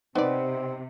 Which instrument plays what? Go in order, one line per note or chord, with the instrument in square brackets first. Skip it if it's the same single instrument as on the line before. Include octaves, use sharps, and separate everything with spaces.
[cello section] C3 [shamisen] B3 D5 [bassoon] C4 [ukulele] D#4 B4